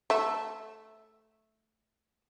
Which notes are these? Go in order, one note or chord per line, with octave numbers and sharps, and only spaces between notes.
A3 E5